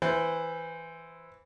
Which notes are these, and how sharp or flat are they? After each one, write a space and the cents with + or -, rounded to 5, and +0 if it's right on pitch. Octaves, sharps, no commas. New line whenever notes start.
E3 +0 C5 -10